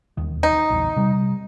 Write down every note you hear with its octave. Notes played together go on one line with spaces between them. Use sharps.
E1 D#2 D#3
D#4
A#1 E2
C3 G3